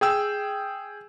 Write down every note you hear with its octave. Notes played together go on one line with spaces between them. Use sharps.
G#4 G5 E6